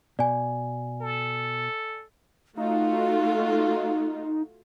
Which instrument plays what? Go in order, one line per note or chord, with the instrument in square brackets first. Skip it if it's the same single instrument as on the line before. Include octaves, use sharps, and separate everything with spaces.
[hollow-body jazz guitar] B2 [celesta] D5 G#5
[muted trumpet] A4
[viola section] A3 F4 F#4 [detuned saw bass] D#4 [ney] F5